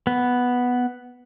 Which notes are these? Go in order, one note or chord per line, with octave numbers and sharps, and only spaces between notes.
B3